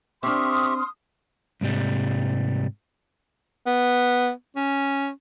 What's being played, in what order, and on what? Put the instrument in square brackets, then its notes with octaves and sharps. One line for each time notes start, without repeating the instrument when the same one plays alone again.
[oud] C4 D4 [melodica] G4 E5 C#6 [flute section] C6 D#6 F6
[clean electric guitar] C2 G#2 C3 G3
[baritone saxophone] B3
C#4